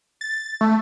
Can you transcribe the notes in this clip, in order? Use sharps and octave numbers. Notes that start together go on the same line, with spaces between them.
A6
A3